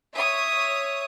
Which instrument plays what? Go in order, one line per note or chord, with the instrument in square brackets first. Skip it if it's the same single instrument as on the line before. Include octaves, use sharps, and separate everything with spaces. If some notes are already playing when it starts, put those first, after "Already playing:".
[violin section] C#5 E5 D#6